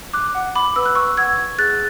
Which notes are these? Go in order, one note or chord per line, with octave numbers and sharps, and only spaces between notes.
D6 F#6
F#5
B5 D6
B4 E6
F#6
C#6 E6
F#5 E6 G#6
G#4 F#6 A6